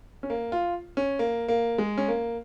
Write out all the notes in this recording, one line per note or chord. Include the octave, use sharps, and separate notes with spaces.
C#4
A#3
F4
C#4
A#3
A#3
G#3
C#4
A#3